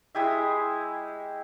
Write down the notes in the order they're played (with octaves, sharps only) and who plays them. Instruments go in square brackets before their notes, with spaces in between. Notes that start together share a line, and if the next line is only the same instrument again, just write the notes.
[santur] G#3 E4 G4 E5